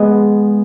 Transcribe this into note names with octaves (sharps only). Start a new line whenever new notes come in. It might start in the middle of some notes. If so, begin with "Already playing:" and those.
Already playing: G#3 B3